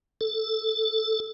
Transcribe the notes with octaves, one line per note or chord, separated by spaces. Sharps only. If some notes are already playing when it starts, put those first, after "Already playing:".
A4